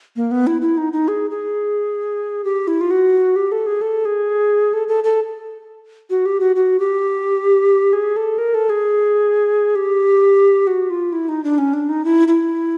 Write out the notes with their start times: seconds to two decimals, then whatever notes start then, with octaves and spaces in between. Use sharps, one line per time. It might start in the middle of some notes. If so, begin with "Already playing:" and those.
0.16 A#3
0.31 B3
0.47 E4
0.62 E4
0.78 D#4
0.93 D#4
1.08 G#4
1.30 G#4
2.44 G4
2.68 E4
2.81 F4
2.91 F#4
3.36 G4
3.52 A4
3.66 G#4
3.82 A4
4.05 G#4
4.73 A4
4.88 A4
5.04 A4
6.10 F#4
6.26 G4
6.40 F#4
6.56 F#4
6.80 G4
7.93 G#4
8.16 A4
8.38 A#4
8.54 A4
8.70 G#4
9.75 G4
10.67 F#4
10.90 F4
11.13 E4
11.29 D#4
11.44 D4
11.58 C#4
11.73 D4
11.89 D#4
12.05 E4
12.28 E4